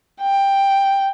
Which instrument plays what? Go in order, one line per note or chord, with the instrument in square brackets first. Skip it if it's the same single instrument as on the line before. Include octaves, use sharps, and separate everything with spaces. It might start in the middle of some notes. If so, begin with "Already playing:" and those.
[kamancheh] G5